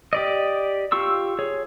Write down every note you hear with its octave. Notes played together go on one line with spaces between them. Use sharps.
G4 D5 D#5
F4 G4 C#6 E6
G#4 C#5